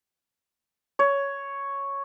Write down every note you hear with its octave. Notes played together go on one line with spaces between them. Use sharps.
C#5